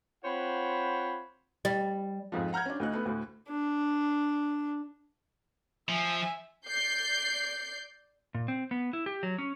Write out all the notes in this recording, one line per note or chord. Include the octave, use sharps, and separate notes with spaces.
C4 F4 C5 C#5 F#5 B5
G3
F2 G#2 F3
F#5 A#5 F6 G6 G#6
C#4 D4
D2 D#4 F#6
A3 B3
D2 A2
D4
F3 E5 G#5
D5 G6 C7
A#2
C4
B3
E4
G4
F#3
C#4